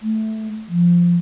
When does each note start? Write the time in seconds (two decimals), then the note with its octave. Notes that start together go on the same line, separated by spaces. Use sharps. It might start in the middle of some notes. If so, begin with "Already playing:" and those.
0.02 A3
0.68 F3